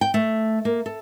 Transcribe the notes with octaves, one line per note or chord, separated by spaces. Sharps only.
G5
A3
A#3
A4